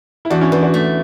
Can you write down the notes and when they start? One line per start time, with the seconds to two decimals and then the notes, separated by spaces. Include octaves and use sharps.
0.25 E4
0.30 E2 D4 F#4
0.41 C#4 E4
0.52 E2 B3 D4
0.62 D4 F#4
0.74 A3